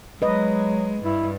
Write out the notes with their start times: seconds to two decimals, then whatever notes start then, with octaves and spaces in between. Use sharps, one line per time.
0.22 F#3 G#3 B4 D#5
1.03 G2 E4